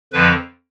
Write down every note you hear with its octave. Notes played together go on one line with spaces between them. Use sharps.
F2 D3 F3 B4